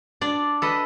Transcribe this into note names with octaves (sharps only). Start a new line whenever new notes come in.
D4 D5
A4 B4 D#5